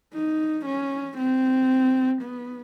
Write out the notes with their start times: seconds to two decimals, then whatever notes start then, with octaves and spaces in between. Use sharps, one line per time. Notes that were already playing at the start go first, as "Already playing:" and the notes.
0.14 D#4
0.66 C#4
1.18 C4
2.22 B3